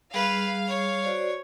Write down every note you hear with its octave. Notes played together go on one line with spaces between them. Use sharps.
G3 G#4 B4 F5
C#5
F#4 C5 D5